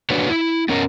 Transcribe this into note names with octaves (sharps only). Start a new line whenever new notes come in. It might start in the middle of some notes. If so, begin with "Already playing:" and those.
A#3 D4 F#4 B4 C#5 D5
E4
B3 C#4 A#4 D#5